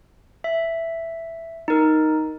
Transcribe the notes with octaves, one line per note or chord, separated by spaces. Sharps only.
E5
D#4 A#4